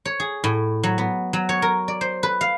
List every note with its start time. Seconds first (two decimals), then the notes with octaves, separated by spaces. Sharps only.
0.05 C#5
0.20 G#4
0.44 A2
0.83 F#3
0.98 B3
1.33 F#3
1.49 C#5
1.62 A#4
1.88 D5
2.01 C5
2.23 B4
2.41 F5